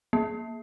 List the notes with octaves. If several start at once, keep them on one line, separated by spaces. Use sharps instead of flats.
A#3